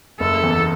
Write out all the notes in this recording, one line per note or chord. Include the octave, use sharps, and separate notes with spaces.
F#1 A4
E2